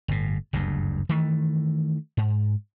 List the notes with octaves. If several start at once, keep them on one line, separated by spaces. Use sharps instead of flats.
G1 A2
F#1 D2 G2
D#3 E3 A3
G#2